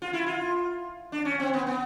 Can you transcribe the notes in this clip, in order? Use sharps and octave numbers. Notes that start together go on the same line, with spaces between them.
F4
E4
F4
D4
C#4
C4
B3
B3